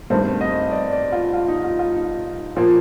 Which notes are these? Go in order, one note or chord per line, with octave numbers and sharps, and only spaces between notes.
G2 D#3 A3 C4 C5
D#5
D5
D5
F4
F4
D#4
F4
F4
D#4
A#2 F3 A#3